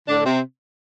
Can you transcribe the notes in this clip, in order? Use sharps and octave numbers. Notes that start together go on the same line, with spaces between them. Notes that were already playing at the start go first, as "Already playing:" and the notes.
A2 D3 D4
C3 C4